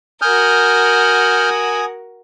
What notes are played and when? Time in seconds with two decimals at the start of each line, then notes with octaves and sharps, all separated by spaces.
0.22 F#4 A#4 G#5 D#6 F6 G6